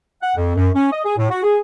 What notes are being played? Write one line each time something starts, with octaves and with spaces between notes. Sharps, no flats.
F#5
F2
F#2
C#4
D#5
G#4
A2
F#4
G#4